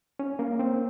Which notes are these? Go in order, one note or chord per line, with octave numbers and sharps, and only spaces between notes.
C#4
A#3
C4